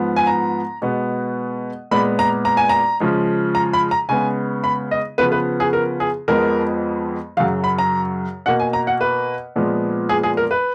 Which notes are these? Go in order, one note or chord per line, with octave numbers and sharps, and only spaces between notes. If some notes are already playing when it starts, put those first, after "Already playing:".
Already playing: G#2 F3 B3
G#5
A#5
B2 G#3 B3
A#2 G#3 B3 B5
A#5
A#5
G#5
A#5
C#3 F3 G#3
A#5
B5
A#5
C#3 G#3 B3 G#5
B5
D#5
C#3 F3 B3 B4
B4
G#4
A#4
G#4
F2 F3 G#3 B3 A#4
F#2 C#3 F#3 F5
B5
A#5
B2 A#3 F#5
G#5
A#5
F#5
B4
A#2 F3 G#3 B3
G#4
G#4
A#4
B4